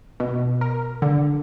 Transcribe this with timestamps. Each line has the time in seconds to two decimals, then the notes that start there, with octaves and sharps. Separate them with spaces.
0.20 B2
0.61 A#4
1.02 D3